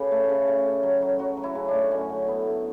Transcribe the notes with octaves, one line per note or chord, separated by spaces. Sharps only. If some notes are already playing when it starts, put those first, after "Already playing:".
Already playing: C#3 G4 A4 B4
A3
C#3
A3
C#3
F#3
F#3
F#3 F#4
F#3
E4
C#3
D4
A3
F#2 C#4
D3
D3 B3
A3